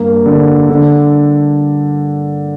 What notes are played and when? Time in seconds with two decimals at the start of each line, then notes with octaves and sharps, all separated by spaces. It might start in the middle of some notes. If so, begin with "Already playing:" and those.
Already playing: G2 A#3
0.26 D3
0.69 D3